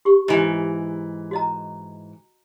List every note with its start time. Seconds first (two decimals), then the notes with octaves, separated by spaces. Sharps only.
0.05 G4 C#6
0.28 G#2 E3 D#5
1.31 F#4 D#5 A#5